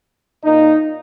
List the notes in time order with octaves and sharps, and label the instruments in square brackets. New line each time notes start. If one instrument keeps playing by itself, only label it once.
[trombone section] A#2 A#3 D#4